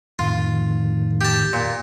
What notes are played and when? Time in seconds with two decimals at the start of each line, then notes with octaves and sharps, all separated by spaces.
0.19 F2 A2 D#3 F4
1.21 G4 A5
1.53 A#2